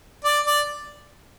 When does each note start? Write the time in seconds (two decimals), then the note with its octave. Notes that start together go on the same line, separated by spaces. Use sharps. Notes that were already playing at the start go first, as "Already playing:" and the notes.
0.25 D5
0.46 D5